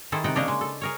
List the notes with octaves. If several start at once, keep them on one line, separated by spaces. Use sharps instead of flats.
D#3 E4 G#4 A4 C5
C3 D#4 F#5 G5 A5
C#3 A#3 D4 D#4 C#5 D#5
G#3
A4
G#4 A#4 C#5